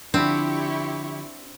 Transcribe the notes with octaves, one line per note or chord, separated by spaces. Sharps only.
D3 F3 C4 D4 E4 G4 C#6